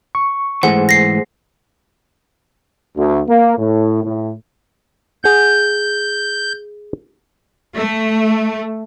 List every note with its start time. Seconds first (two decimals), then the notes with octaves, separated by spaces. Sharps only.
0.15 C#6
0.63 G#2 E3 A3 G#4 C5 F#5
0.89 A#6 C7
2.95 D2
3.27 A#3
3.57 A2
4.03 A2
5.24 G#4 F#5 G6
7.77 A3